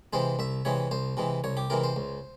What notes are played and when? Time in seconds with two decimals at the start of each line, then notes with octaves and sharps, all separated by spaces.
0.13 C3 E3 G#3 C5
0.39 C2 E5
0.65 C3 E3 G#3 C#5
0.91 C2 C5
1.17 C3 E3 G#3
1.44 C2 C#5
1.57 G4
1.70 C3 E3 G#3 A#4
1.83 C5
1.96 C#2